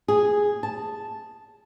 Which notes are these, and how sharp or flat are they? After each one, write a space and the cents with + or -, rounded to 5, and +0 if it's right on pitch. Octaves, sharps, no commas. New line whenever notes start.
G#4 -5
A5 -5